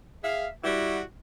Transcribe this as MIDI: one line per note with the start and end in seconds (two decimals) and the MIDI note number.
0.24 0.48 68
0.24 0.48 76
0.24 0.48 77
0.64 1.02 55
0.64 1.02 64
0.64 1.02 66